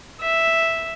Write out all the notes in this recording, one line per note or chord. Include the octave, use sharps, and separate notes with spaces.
E5